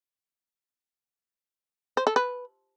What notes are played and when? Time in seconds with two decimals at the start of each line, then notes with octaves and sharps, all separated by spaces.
1.97 C5
2.07 A4
2.16 B4